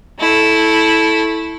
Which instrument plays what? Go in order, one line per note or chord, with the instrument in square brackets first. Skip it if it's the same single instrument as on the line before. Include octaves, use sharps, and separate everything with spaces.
[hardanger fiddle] A3 E4